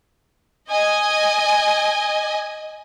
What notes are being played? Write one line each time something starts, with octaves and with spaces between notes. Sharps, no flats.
D#5 G#5